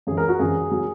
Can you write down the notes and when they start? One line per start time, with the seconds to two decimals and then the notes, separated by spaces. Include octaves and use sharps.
0.07 F#2 E3 G#4
0.17 A#4
0.29 F#4
0.39 F#2 E3 G#4
0.71 F#3